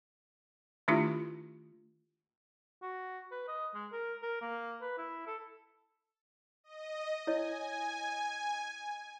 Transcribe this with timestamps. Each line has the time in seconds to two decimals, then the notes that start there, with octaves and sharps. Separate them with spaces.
0.88 D#3 A3 D4 E4 F4 G4
2.82 F#4
3.31 B4
3.48 D#5
3.74 G#3
3.92 A#4
4.22 A#4
4.42 A#3
4.82 B4
4.98 E4
5.27 A4
6.64 D#5
7.27 E4 C#5 D#5 G#5